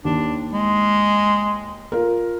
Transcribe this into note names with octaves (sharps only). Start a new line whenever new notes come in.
D#2 D4
G#3
F4 A#4